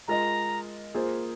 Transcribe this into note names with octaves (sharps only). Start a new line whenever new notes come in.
G#3 F4 A#4 D#5 A#5
A#3 F4 G#4 C5